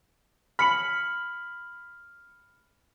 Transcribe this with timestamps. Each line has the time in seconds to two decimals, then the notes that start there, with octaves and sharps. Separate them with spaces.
0.59 B5 F6 C#7 F#7